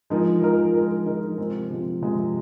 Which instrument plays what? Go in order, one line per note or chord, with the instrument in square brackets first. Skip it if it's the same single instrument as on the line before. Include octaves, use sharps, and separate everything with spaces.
[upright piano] F3 G#3 D#4 A#4
F3 G#3 D#4 A#4
F3 G#3 D#4 A#4
F3 G#3 D#4 A#4
C3 F3 G#3 C4
C3 F3 G#3 C4
C3 F3 G#3 C4